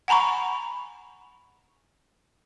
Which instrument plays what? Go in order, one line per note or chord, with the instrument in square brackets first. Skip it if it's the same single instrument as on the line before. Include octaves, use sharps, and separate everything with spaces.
[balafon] F#5 G#5 A#5 B5 C#6